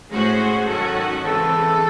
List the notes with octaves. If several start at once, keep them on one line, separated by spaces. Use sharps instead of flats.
A2 G#3 C#4 F#4 G#4 C5
G#2 D#3 F#3 C#4 F#4 A4
C#3 E3 C4 A4